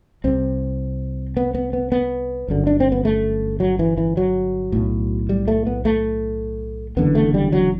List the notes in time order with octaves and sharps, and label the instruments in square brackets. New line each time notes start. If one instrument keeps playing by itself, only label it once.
[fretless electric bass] C2 C3 C4
B3
B3
B3
B3
G1 F#2 D3
D4
C4
B3
A3
F#3
E3
E3
F#3
B1 A2
G3
A3
B3
A3
F#1 E2 D3 B3
A3
G3
F#3